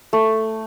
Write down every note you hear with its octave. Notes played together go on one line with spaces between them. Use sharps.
A3